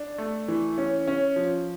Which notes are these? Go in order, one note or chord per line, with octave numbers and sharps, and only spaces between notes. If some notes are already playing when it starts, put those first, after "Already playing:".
Already playing: D4
A3
E3
C#4
C#4
F3